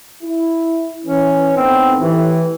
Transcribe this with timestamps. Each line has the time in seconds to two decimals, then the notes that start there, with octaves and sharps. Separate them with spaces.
0.22 E4
1.05 E3 C#4
1.57 A2 B3 C4 D#4
1.99 A2 E3 E4 G4